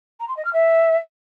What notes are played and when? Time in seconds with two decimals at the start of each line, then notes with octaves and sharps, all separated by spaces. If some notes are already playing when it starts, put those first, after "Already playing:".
0.20 A#5
0.28 C6
0.37 D#5
0.45 F6
0.53 E5